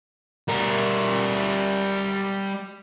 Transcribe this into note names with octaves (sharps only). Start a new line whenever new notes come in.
G3 A#4